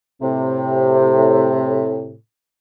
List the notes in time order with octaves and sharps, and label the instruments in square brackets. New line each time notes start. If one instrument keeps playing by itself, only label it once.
[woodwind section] A2 C3